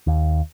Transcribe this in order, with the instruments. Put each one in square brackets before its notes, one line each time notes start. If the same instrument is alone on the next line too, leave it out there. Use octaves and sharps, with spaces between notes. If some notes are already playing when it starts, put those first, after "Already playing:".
[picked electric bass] D#2